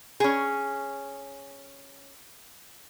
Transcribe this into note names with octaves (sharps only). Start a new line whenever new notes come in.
C#4 G#4